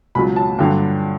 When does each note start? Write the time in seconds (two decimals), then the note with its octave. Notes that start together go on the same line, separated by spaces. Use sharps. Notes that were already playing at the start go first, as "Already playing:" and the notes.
0.15 C#2 B2 F#3 B5
0.36 A5
0.58 G2 D3 F#3 G5